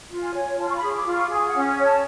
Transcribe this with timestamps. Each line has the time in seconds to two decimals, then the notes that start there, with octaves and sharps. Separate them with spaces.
0.10 F4
0.22 G#5
0.34 C#5
0.58 F4 A5
0.69 C#6
0.75 B5
0.82 G#4
0.94 D6
1.06 F4
1.12 C#6
1.29 G#4 G#5
1.41 G#5
1.47 F#5
1.54 C#4
1.66 G#5
1.78 C#5
1.83 A5